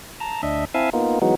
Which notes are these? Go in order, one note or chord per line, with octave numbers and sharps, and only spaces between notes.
A5 A#5
D2 D4 D#5 E5
C4 E4 E5 F5 G#5 A5
A#3 B3 D#4 F4
E3 F#3 G#3 B3 D#4 F#4